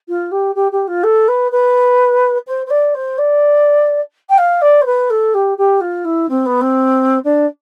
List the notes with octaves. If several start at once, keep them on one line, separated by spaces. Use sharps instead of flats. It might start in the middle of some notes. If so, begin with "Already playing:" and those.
F4
G4
G4
G4
F4
A4
B4
B4
C5
C5
D5
C5
D5
G5
F5
D5
C5
B4
A4
G4
G4
F4
E4
C4
B3
C4
D4